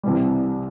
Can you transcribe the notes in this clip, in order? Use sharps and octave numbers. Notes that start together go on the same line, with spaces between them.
C2 C3 E3 G3